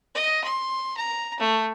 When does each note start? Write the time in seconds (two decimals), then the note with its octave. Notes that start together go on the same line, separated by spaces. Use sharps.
0.15 D#5
0.44 C6
0.97 A#5
1.40 A3